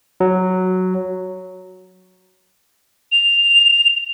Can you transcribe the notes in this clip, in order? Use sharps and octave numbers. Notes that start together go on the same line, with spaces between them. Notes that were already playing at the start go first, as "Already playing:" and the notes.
F#3
F7